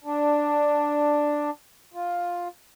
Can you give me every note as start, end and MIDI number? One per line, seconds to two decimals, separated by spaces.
0.04 1.50 62
1.94 2.48 65